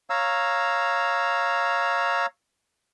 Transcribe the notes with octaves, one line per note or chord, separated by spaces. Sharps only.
C#5 F5 A#5 E6